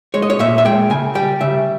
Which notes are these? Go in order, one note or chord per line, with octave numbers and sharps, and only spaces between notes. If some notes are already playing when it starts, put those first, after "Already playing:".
G#3 C#5
D#5
C#5
A#2 E5
E5
G#3 G5
C#3 G#5
G3 G5
C#3 E5